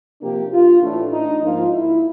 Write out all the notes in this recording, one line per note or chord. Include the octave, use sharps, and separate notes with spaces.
C3 F3 A#3 D4 G4
F4
A2 E3 A3 D4
D#4
G#2 F3 A#3 D#4 F4
E4